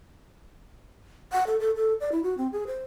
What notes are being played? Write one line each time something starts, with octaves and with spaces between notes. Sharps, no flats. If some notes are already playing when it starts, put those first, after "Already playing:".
F#5
A4
A4
A4
D5
E4
F#4
C4
G#4
C5